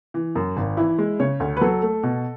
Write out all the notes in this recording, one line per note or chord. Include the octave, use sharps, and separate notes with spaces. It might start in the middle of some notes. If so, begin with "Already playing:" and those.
E3
F#2
G#1
E3 E4
G#3
C#3 C#5
D2
B4
F#3 A4
A3
B2